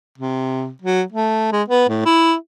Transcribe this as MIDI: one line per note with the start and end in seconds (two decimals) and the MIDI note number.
0.18 0.70 48
0.82 1.03 54
1.12 1.48 57
1.52 1.63 56
1.68 1.86 59
1.89 2.02 45
2.06 2.34 64